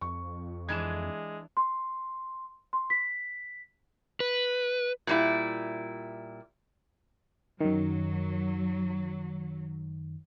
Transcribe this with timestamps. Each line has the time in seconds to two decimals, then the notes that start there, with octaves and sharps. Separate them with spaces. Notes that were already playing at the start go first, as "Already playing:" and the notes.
0.01 F2 C#6
0.69 E3 G#3 D4 G#6 E7
1.57 C6
2.73 C6
2.90 B6
4.20 B4
5.07 A#2 G3 E4
7.61 F#2 D#3 F#3